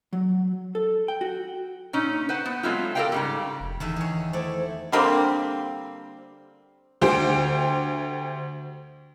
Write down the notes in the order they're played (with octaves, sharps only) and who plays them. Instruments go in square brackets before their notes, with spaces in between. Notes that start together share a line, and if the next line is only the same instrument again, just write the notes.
[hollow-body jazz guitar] F#3
A4
G5
F#4
[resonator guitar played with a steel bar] A#2 C#4 D#4
B4 C5 F#5
B3
F#3 G#3 A3 B3 C4 F4
A4 A#4 C#5 D5 F5 G5
G#2 C#3 G3
[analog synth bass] F1
[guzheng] E2 D#3 E5 [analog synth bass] D3
[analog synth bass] E3 [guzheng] G#4 C#5
[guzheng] A3 E4 D5 [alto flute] C5
[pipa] D3 G3 A#3 C4
[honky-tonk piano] D2 G4 C5 G5